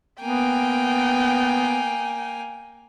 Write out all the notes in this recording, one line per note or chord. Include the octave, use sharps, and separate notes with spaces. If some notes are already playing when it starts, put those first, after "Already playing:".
A#3 B3 G5 G#5